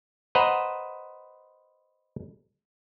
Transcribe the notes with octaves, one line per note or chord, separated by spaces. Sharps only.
B4 C5 D#5 F#5 A#5